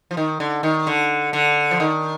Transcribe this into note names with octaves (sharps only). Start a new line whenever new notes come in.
F3
D#3
D3
D#3
D3
D3
F3
D#3